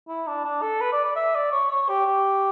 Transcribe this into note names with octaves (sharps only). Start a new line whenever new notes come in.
E4
D4
D4
A4
B4
D5
D5
E5
D5
C#5
C#5
G4
G4